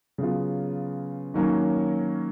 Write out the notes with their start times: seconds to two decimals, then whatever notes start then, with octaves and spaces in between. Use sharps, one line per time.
0.18 C#3 F#3 B3 F4
1.34 D#3 F#3 A#3 C#4